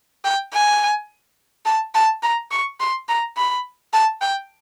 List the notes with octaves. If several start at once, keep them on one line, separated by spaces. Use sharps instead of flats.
G5
G#5
A5
A5
A#5
C#6
C6
A#5
B5
A5
G5